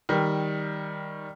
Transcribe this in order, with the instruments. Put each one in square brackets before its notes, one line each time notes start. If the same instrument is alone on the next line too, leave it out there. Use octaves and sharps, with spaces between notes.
[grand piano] D#3 G3